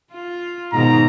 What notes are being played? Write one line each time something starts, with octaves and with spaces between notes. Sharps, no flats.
F4
G#2 B2 D#3 A#5